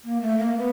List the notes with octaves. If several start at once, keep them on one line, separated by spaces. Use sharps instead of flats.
A#3
A3
A#3
B3